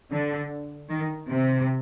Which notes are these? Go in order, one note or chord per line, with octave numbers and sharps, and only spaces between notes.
D3
D#3
C3